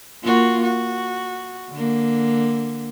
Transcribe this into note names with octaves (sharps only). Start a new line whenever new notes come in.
A#3 F4 F#4
F#4
D3 A#3